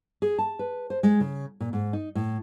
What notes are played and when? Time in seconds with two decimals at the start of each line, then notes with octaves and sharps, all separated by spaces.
0.22 G#4
0.38 A5
0.59 B4
0.90 C5
1.03 G#3
1.20 C#3
1.60 A#2
1.73 G#2
1.93 D#4
2.15 A2